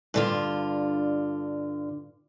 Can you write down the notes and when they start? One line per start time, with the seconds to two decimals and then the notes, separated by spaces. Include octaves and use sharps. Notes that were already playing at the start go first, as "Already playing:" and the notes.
0.14 G2 D3 F4